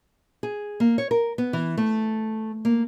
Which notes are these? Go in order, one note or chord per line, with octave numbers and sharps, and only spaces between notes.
G#4
A#3
C#5
A#4
B3
E3
A3
A#3